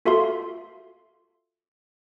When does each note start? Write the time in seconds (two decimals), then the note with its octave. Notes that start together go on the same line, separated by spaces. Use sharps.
0.05 F4 F#4 A4 E5 F5 C6